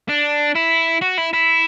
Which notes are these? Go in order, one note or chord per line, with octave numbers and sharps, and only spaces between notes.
D4
E4
F#4
E4
E4